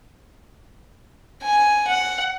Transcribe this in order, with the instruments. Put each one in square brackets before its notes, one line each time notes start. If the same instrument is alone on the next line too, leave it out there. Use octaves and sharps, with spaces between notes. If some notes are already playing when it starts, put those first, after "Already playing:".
[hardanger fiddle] G#5
F#5